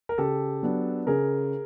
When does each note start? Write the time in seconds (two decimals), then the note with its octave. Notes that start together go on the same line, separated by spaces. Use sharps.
0.09 A#4
0.18 C#3 G4 A4
0.63 F#3 B3 D4
1.07 C#3 G#4 A#4